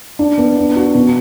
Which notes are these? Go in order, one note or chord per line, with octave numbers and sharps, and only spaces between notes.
D4
B3
D4
F#4
B2